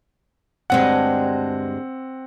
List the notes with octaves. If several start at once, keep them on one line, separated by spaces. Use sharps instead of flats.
D2 G2 G#3 C4 F#5